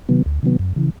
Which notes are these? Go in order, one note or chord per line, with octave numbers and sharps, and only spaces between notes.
C3 D#3 F#3 B3
D2
C3 D#3 F#3 B3
F#2
C#3 E3